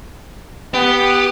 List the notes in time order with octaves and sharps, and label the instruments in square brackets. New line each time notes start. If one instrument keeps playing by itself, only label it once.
[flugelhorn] B3 [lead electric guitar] G4